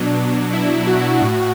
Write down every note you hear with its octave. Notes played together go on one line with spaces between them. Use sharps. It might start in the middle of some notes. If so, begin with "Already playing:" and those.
Already playing: B2 F#3 D4
E4
F#4
A2